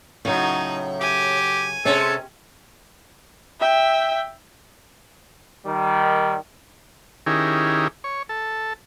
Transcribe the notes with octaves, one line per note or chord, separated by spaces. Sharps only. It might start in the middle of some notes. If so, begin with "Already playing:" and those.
A2 C#3 F#3 D#4
G4 G#5
C3 G#3 C#4 A4
E5 G5
D#3 G3
D#3 C#4 E4 G4 G#4 A#4
C#5
A4